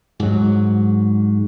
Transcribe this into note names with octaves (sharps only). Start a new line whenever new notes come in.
G#2 F#3